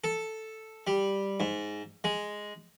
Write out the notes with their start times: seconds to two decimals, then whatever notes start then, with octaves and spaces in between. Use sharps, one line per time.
0.04 A4
0.87 G3
1.40 G#2
2.04 G#3